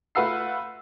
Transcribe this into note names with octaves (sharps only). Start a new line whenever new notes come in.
A3 F4 B4 F#5 E6 C7